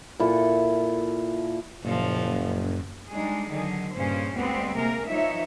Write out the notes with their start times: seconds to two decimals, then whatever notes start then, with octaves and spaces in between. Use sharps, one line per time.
0.19 A#2 E4 A4
1.83 F#1 F#2 A#2 F3
3.10 G3 G#3 D4 D#4 G#4
3.49 D3 D#3 F#3 G#4
3.94 G2 A#2 C#3 C#4 C5
4.35 D2 G3 G#3 B3 C4 G4
4.76 C3 A#3 G#4 A#4
5.07 E3 F3 D#4 C#5 E5